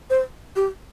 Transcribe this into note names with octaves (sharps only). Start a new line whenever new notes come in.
C5
G4